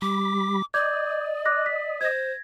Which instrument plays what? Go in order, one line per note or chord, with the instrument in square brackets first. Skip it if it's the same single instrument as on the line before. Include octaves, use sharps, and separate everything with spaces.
[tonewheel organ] G3 B5 [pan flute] D6
[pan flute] D5 [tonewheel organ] D#5 [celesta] D6 G6 G#6
[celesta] D6 F#6 A#6
B6
[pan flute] C5 [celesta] G#6 A#6